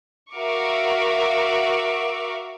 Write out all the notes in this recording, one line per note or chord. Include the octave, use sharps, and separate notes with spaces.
F#4 A#4 E5 F5 C#6 D6